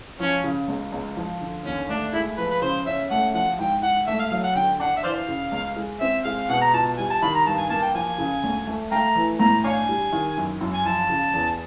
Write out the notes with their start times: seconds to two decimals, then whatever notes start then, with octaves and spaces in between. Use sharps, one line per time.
0.19 F3 C#4
0.44 C#3
0.68 C#2
0.92 C#2
1.16 F3
1.41 D3
1.65 D#2 C#4
1.89 A3 D4
2.13 G#3 E4
2.37 F3 B4
2.50 B4
2.62 C#3 C5
2.86 C#4 E5
3.10 A3 F#5
3.34 F3 F#5
3.58 G#2 G5
3.82 G#2 F#5
4.07 A3 E5
4.19 F5
4.31 F#3 F5
4.43 F#5
4.55 D3 G5
4.80 D4 F#5
4.96 E5
5.04 E3 C5 D5 F5
5.28 C#3
5.52 C#2
5.76 G#3
6.01 C4 E5
6.25 G#3 F5
6.49 B2 F#5
6.61 A#5
6.74 F4 A5
6.97 G3 G#5
7.10 A5
7.22 D#3 B5
7.35 A#5
7.46 G2 A5
7.58 G#5
7.70 A#3 A5
7.82 G5
7.95 F3 G#5
8.18 C#3
8.43 D2
8.67 A3
8.91 A3 F5 G5 A#5
9.15 E3
9.40 A2 A#5
9.64 D4 C#5 F5 G#5
9.89 G3
10.13 D#3
10.37 F#2
10.61 F#2
10.73 G#5
10.85 F3 A5
11.10 C#3
11.34 E2